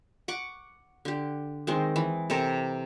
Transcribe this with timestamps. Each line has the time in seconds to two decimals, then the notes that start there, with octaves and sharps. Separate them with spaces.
0.28 F#5 C#6 D6
1.05 D3 G4
1.67 D#3 G#3 C4
1.96 E3
2.30 C3 C4 A4 A#4